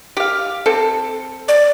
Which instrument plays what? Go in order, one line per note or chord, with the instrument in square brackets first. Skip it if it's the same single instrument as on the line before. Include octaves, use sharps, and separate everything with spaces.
[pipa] G4 F5
C4 A4
[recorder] D5